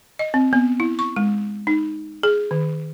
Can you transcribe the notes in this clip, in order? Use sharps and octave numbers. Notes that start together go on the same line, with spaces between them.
D#5
C4
B3
E4
C#6
G#3
D#4
G#4
D#3